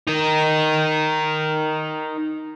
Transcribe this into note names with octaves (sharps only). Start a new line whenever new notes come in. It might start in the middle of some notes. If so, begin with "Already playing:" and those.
D#4 A#4